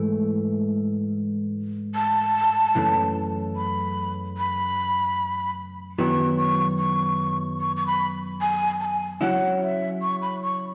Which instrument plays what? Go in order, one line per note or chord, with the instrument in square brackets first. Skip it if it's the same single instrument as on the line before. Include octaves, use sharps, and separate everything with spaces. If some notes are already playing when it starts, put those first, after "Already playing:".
Already playing: [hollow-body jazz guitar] G#2 E3 A3 E4
[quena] A5
[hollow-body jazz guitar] F#2 C#3 E3 A3
[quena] B5
B5
[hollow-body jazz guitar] F#2 D#3 F#3 B3 E4 [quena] C#6
[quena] C#6
C#6
C#6
C#6
B5
G#5
A5
G#5
[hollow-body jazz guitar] C#3 F#3 C#4 E4 [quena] F#5
[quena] E5
C#6
B5
C#6